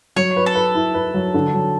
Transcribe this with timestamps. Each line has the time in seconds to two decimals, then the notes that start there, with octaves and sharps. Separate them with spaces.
0.16 F#3 C#5
0.37 B4
0.46 A4
0.55 B4
0.75 E4
0.94 B4
1.14 F#3
1.34 D3
1.53 F#3